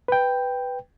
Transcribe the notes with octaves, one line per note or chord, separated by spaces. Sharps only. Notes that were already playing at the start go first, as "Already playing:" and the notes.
B4 G5